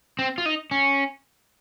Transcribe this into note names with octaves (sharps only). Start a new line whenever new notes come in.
C4
F4
D#4
C#4